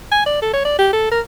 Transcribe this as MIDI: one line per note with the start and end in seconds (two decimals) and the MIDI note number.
0.12 0.26 80
0.26 0.40 74
0.42 0.52 69
0.54 0.61 73
0.65 0.78 74
0.79 0.91 67
0.93 1.09 69
1.12 1.20 70